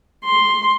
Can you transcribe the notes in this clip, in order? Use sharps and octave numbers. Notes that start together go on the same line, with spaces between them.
C6